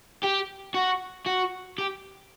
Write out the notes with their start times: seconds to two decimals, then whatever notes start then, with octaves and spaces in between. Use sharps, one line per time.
0.23 G4
0.75 F#4
1.26 F#4
1.78 G4